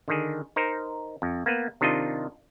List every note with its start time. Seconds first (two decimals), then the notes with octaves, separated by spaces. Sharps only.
0.08 D3 D#3 G#4
0.56 D#4 A#4 C5
1.22 F2
1.46 A#3 B3 B4
1.81 C3 D#3 D4 D#4 F4 D#5